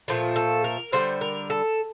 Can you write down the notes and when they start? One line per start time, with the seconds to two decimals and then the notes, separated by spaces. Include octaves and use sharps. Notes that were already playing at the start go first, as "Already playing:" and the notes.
0.08 A#2 F3 A3
0.36 A4
0.64 A#4
0.92 D3 G3 C5
1.21 A#4
1.50 A4